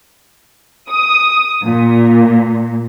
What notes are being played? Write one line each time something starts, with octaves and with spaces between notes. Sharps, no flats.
D#6
A#2